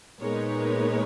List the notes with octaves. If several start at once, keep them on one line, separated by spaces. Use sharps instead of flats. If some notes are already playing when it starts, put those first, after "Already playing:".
A#2 G#3 B3 D#4 A#4 C#5